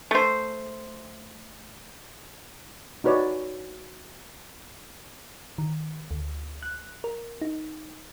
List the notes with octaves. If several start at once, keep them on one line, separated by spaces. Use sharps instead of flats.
A3 C5
D#4 F#4 B4 C#5 D5
D#3
D2
F#6
A#4
D#4